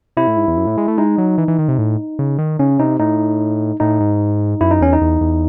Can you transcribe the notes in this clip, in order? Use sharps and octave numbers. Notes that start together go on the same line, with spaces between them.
C3 E4
A2
G#2
E2
F#2
A2
G#3
A3
G#3 D#4
F#3
E3
E3
D#3
C3
A2
C#3
D#3
C#3 C#4
C3 D#4
A2 D#4
A2 D#4
G#2
F#2 E4
D#4
E2 C#4
D#4
E2
E2